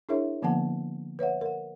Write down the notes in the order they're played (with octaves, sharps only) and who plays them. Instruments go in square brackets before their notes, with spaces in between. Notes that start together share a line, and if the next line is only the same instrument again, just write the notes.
[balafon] D4 E4 G#4 A#4 C#5 E5
D3 F3 A#3 B3 F#5 A5
B4 C#5 E5 F#5
A#4 F#5